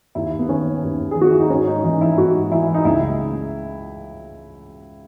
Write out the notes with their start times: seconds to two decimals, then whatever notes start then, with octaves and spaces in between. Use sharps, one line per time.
0.15 D#2 E4
0.39 B3
0.49 D#3 C#4
0.83 D#2
1.11 G#4
1.16 D#3
1.21 F#4
1.31 E4
1.40 D#4
1.50 G#2 C#4
1.67 D#4
1.83 E3 D#4
2.01 E4
2.17 G#2 F#4
2.51 E3 E4
2.74 D#4
2.85 C#2 E4